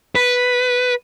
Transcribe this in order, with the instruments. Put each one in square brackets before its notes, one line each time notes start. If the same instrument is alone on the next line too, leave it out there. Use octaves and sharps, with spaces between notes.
[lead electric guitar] B4